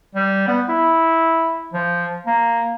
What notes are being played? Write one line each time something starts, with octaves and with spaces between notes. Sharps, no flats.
G3
B3
E4
F3
A#3